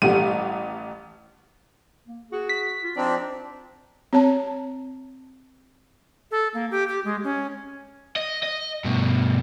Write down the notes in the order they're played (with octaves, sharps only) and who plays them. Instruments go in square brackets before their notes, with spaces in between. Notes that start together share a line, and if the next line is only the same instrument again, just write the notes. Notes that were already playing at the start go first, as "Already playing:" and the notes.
[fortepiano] A1 G4 F#5 [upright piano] G3 D#7
[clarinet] A#3
[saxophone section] F#4 [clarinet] G#4
[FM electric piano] B6
[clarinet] F4
[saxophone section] F3 D#4 D5 [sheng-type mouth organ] C4 D4
[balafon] C4 C#5 A5
[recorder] A4
A#3
G4
G4
G#3
C#4
[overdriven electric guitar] D#5
D#5
G2 B2